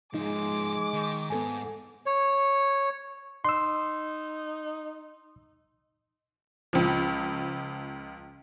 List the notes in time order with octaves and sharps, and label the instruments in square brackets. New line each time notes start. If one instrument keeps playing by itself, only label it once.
[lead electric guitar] G#2 F3 [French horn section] G#3 [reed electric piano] D#4 [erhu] D6
[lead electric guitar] D#3
[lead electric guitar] G#2 [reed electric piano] B3 A4 G#5
[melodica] C#5
[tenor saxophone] D#4 [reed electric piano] C6 E6
[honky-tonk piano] C#2 F3